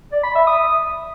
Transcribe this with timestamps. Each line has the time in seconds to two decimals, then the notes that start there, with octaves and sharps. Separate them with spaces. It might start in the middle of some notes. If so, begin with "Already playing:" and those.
0.12 D5
0.24 B5
0.35 E5
0.47 D#6